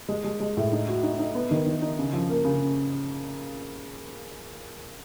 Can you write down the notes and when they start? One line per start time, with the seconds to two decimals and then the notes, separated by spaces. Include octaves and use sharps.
0.09 G#3
0.24 G#3
0.40 G#3
0.57 A2
0.72 D#4
0.88 F#4
1.03 D#4
1.19 D#4
1.35 B3
1.51 D#3
1.66 D#3
1.82 D#4
1.99 C#3
2.13 F3
2.30 A#3
2.45 C#3